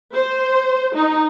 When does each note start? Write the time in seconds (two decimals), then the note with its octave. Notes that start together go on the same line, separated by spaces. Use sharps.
0.13 C5
0.95 D#4